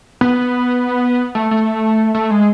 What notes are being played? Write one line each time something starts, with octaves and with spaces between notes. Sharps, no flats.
B3
A3
A3
A3
G#3